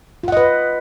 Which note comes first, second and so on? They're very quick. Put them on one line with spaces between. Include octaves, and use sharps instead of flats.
F4 F#5 D#5 B4